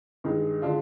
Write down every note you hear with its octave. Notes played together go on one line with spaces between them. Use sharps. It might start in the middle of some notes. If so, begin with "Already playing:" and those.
G2 D#3 G#3 D#4 G#4
D3 G#3 D4 F4